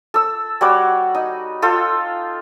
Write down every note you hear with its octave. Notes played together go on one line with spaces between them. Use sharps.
A4 E6
G3 F#4 C#5 D6
D#4
F4 A4 G5